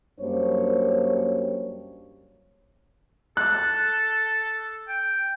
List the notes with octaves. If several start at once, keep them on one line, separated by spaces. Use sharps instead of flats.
F#2 G3 A#3 D4 C5 C#5
A4 F#6
G5